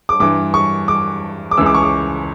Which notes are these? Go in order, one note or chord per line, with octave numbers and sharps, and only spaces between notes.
D6
G2 E3 D6
C#6
D6
D6
C#2 C#3 E3 E6
D6
C#6
D6